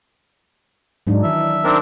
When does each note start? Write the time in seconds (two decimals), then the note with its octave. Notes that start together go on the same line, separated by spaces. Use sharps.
1.07 G#2 F#3 D4 D#4
1.23 D#3 E3 E5
1.64 C4 D4 D#4 A#4